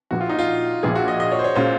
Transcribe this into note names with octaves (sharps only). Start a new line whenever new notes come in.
A#1 A#2 F3 F#4
F4
D#4
F4
A#1 A#2 F3 G#4
F#4
D#5
D#5
C#5
C5
C#5
A#2 G#3 C#4 F#4 C5